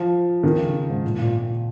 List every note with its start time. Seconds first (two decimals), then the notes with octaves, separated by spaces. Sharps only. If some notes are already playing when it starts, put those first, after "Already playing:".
Already playing: F3
0.43 D#3
0.58 C#3
0.89 G#2
1.04 A#2
1.18 A#2
1.34 A#2